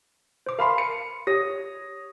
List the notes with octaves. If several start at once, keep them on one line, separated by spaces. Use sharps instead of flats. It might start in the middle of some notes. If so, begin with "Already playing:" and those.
C5 D6
A#4 F5 A5 B5 C6
C#7
G4 C#5 D#6 A#6